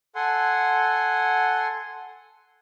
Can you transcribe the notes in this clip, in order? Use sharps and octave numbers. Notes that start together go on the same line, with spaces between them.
A4 F#5 G#5 C6